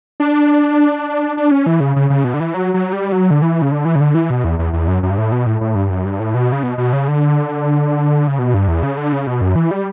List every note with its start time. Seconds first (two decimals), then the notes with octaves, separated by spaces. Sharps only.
0.20 D4
1.37 D4
1.51 C#4
1.66 E3
1.80 C#3
1.96 C#3
2.10 C#3
2.24 B2
2.34 D3
2.40 E3
2.54 F#3
2.74 F#3
2.93 G3
3.12 F#3
3.31 D3
3.42 E3
3.62 C#3
3.72 D3
3.85 E3
3.95 C#3
4.01 D3
4.15 E3
4.30 B2
4.44 E2
4.59 E2
4.73 E2
4.88 F#2
5.03 F#2
5.11 G2
5.18 A2
5.32 B2
5.46 A2
5.61 A2
5.75 G2
5.90 F#2
6.05 G2
6.20 A2
6.35 B2
6.52 C#3
6.63 B2
6.78 B2
6.93 C#3
7.08 D3
8.27 C#3
8.39 B2
8.54 G2
8.68 E2
8.83 C#3
8.97 D3
9.12 C#3
9.27 B2
9.41 F#2
9.56 E3
9.71 G3